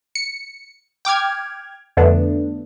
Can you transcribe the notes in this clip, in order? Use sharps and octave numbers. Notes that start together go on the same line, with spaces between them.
C#7
G5 D6 F6 G#6
F2 D3 A3 B3 D4